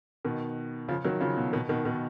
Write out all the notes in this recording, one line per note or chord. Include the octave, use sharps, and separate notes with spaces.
B2 D#3
C#3 F3
D#3 F#3
C#3 F3
B2
B2 D#3
B2 D#3
B2 D#3